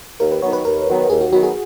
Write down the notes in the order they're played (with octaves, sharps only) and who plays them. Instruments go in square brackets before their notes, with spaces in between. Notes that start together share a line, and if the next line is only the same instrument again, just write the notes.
[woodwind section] D#2 [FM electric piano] A#4
[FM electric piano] B4
[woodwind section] D#3 F#3 B3 [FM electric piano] C#5
[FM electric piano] B4
[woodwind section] D#2 [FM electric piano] A#4
[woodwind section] D#3 F#3 B3
[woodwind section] D#2 [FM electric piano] G#4
[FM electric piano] F#4
[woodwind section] D#3 F#3 B3 [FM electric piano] F#4
[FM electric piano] G#4